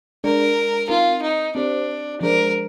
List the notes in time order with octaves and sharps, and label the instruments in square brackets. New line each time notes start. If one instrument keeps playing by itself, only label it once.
[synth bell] G#3 D4 G#4 D5 [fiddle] A#4
[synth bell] C4 D#4 A#4 [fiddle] F4
[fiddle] D#4
[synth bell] C4 G4 C5 [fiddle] D4
[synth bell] F3 G#3 D4 G#4 C5 [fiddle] A#4